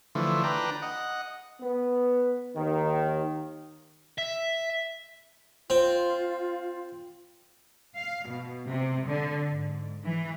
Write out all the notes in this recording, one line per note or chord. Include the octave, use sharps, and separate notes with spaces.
D3 E3 F3 A3
D4 B4 G5 A#5
D#5 F#5
B3
D#2 D#3
E5
C4 F4
F5
B2
C3
D3
G#2
E3